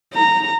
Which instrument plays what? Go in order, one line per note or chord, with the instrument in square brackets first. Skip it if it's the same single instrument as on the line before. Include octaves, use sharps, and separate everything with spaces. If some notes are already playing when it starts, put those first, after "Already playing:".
[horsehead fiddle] A#5